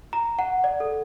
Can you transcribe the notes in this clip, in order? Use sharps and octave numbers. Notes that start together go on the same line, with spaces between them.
A#5
F#5
D5
A4